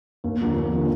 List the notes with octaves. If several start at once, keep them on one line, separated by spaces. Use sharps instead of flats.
D#2
D3 F3 A#3
D#2
D3 F3 A#3